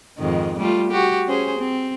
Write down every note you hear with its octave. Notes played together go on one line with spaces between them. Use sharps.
F2 G#2 D#3
G3 A3 F4
F#4 G4
C#4 G#4 C5
C4